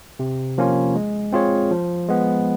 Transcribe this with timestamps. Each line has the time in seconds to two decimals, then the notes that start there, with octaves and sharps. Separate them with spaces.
0.19 C3
0.58 F3 A#3 C#4 F4
0.96 G#3
1.32 C4 F4 G#4 C#5
1.71 F3
2.08 G#3 B3